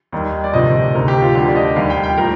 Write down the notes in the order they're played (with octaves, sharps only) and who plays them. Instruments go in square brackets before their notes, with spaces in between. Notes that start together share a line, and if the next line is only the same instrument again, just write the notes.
[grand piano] D#2 D#3 G3
D5
D2 C3 F3 D#5
D2 C3 D#3 A#4
G4
F4
D2 D3 F3 G4
D5
D#5
D#2 D#3 G3 F5
G5
G5
A2 F3 A#4